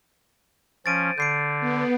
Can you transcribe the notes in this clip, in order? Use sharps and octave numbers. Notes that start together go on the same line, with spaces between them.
F3 C#4 A6 D7 D#7
D3 G6 C7 D7
B3